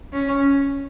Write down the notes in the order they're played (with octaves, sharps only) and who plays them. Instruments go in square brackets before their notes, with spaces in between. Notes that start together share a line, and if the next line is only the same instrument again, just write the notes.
[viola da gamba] C#4